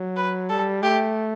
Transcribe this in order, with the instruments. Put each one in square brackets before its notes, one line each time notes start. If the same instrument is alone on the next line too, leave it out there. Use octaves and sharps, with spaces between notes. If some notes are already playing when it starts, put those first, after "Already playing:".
Already playing: [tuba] F#3
[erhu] B4
[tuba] G3 [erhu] A4
[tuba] A3 [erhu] G4